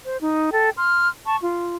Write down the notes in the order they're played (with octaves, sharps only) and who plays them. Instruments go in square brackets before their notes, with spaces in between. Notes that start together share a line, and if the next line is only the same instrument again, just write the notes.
[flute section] C5
D#4
A4 G5
C6 F6
A5 C#6
F4